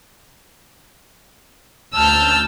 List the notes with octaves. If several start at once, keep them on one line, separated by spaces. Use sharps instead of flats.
D2 A5 E6 F6 G6